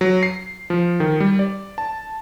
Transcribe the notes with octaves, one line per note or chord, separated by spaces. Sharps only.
F#3
C7
F3
D#3
G3
D5
A5